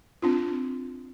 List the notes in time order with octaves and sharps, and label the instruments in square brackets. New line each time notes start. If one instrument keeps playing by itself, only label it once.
[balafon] C4 D4 F4